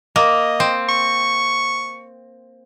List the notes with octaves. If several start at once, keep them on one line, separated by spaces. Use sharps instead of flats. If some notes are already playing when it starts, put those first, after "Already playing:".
A#3 D#5
C4
C#6